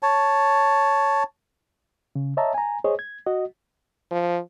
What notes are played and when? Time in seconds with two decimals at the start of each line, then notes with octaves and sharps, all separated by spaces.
0.03 C#5 A5
2.15 C#3
2.37 C#5 D#5 E5 A5 A#5
2.54 G#5 A#5
2.84 G#4 C5 C#5 D#5
2.99 G#6
3.26 F#4 D#5
4.11 F3